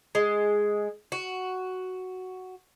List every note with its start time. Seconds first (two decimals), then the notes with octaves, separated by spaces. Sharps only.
0.15 G#3
1.12 F#4